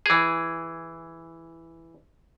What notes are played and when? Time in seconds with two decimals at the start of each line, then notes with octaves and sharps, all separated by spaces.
0.06 E3 G#4